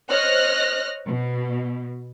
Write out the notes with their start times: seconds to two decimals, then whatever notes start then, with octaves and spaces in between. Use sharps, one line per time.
0.10 C5 C#5 D#5 F6 F#6 A#6
1.06 B2